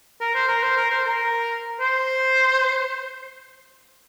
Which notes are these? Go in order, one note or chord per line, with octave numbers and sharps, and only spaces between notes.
A#4
C5
A#4
C5
A#4
C5
A#4
C5